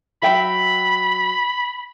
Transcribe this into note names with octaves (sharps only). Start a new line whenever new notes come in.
F#3 E5 G5 B5